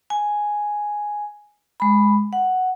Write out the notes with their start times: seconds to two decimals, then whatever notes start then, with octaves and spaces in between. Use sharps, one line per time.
0.10 G#5
1.80 G#3 B5
2.33 F#5